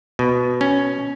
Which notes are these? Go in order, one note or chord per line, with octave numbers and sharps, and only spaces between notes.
B2
C#4